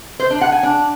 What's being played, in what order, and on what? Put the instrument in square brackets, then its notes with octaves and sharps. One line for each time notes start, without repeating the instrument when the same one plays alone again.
[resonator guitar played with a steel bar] C5
D4
F#5
G#5
D4